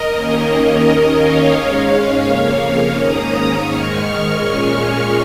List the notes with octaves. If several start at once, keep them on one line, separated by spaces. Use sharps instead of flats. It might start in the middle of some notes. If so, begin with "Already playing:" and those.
Already playing: A#4 D#5
D#2 D#3 A#3 C#4
D#2 D#3 C#4 A#4 D#5
C#5 F5
G#2 G#3 C#4 C#5 F5
F2 C#3 A#3 C#4
G#2 D#3 A#3 C#4 A#5 D#6
G#2 D#3 G#3 C#6 F6
A#2 G#3 C#4